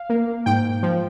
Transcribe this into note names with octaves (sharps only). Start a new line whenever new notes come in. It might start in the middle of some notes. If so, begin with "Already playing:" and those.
Already playing: F5
A#3
G#2 G5
F3